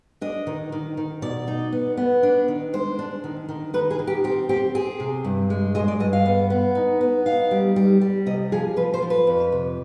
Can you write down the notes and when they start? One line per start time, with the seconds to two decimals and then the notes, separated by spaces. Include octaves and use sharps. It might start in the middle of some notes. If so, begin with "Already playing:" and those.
0.21 D4 D#5
0.47 D#3
0.72 D#3
0.97 D#3
1.22 B2 D5
1.48 D#4
1.72 B3
1.97 B3
2.23 D4
2.48 D#3
2.73 G#3 C5
2.99 D4
3.24 D#3
3.49 D#3
3.74 D#3 B4
3.91 G#4
3.99 D#3
4.07 G4
4.24 C4 G4
4.49 C4 G4
4.75 C4 G#4
5.00 C3
5.25 G2
5.50 G#3
5.75 G#3 D#5
5.88 D5
6.00 G2 D#5
6.13 F5
6.26 B3
6.50 B3
6.75 D#4
7.01 B3
7.26 D#4 F5
7.51 G3
7.76 G3
8.01 G3
8.26 C3 D#5
8.52 F3 G#4
8.77 F3 B4
8.94 C5
9.02 F3
9.10 B4
9.27 F2
9.52 C3